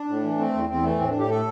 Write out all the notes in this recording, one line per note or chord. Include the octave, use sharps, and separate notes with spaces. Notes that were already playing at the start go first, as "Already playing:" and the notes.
Already playing: D4
A2
E3
A3 C4
E2
E2 C4
E3 A3
A2 C4
A2 D4
G4
A3 A4